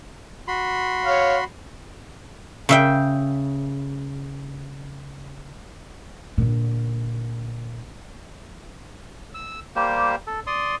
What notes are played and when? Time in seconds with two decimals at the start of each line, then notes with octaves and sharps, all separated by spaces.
0.48 F#4 B5 C6
1.05 C#5 F5
2.69 C#3 E5 G5
6.38 A#2 D3
9.34 E6
9.76 G3 A#3 G4 C5
10.27 A4
10.47 D5 C6 D#6